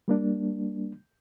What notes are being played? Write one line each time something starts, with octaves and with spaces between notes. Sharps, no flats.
G3 A#3 D4